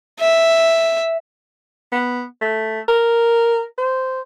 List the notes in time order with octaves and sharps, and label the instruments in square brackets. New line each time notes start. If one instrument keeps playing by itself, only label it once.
[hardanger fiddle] E5
[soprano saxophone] B3
A3
A#4
C5